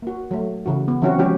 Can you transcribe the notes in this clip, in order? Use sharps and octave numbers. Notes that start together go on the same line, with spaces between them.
A#3 F#4
F#3 A3
C#3 E3 F#4
B3
E3 F#3 C4 C#4 E4 F#4
F3 F#3 G#3 C#4 F#4 G4